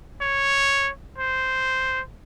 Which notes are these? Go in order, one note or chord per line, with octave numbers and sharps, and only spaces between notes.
C#5
C5